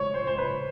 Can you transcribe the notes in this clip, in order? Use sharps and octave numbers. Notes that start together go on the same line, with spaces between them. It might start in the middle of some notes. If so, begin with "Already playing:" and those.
Already playing: C#5
C5
C5
B4